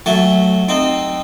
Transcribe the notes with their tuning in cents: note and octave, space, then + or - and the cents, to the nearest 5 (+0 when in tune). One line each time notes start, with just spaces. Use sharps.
F#3 +0 A3 +0 G5 +45
C4 +0 D#4 -20